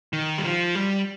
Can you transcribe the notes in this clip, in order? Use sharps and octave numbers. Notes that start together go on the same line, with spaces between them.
D#3
G3
F3
G3